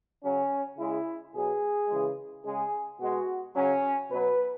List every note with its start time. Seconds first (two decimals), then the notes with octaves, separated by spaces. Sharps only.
0.24 C#3 F#3 C#4
0.79 C#3 G#3 E4
1.34 B2 F#3 G#4
1.89 C#3 E3 G#3
2.45 C#3 G#3 G#4
3.00 B2 G#3 F#4
3.55 C#3 F#3 C#4
4.11 B2 F#3 B4